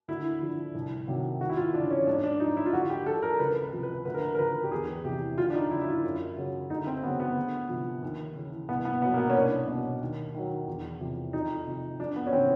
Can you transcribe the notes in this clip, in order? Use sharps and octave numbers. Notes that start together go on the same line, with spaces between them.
D2 E4
D3 F3
C2
C3 D#3 F#3
D#2 F#4
E4
F4
C#3 E3 D4
C#4
G#2 D4
D4
F3 D#4
E4
F4
D2 F#4
G4
D3 F3 A4
A#4
C#2 B4
B4
C3 F3
B4
D2 B4
A#4
B4
A#4
C#3 F3 B4
G4
E2 G#4
C3 E3 G4
D2 F4
D4
D#4
C#3 F3 E4
E4
F4
F#2
C#3 F#3
D2 D#4
C4
C#3 F#3 B3
B3
D2
C3 F3
D#2
C#3 E3
C2 B3
B3
B2 F#3 B3
A#3
B3
C#4
C2 D4
B2 F#3
D#2
D#3 F#3
E2
C3 F3
F2 D#4
C3 F3
F2 D4
B3
C#4
C3 E3 C4